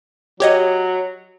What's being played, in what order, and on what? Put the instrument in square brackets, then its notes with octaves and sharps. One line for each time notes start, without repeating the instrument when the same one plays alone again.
[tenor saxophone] F#3 [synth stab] G4 C#5 D#5